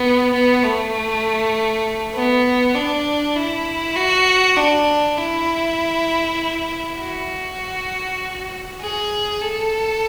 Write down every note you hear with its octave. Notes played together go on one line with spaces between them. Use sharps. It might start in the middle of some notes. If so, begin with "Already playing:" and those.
Already playing: B3
B3
A3
B3
D4
E4
F#4
D4
E4
F#4
G#4
A4